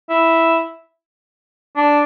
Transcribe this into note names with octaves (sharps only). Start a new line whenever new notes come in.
E4
D4